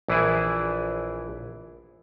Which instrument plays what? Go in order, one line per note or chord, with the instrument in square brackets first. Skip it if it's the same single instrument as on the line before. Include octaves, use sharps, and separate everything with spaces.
[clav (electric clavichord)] A#1 E3 E4 G#4 D5